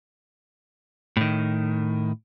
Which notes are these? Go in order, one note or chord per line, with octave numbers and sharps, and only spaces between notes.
A2 D#3